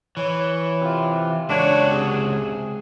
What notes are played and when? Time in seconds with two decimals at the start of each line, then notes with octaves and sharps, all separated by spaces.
0.17 E3 C#5
0.81 C3 F4
1.49 C#2 D4 F#4 C#5
1.90 C3 G#4